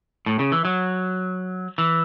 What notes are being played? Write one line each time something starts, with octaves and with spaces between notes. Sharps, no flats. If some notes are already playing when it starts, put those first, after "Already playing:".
A2
C#3
E3
F#3
E3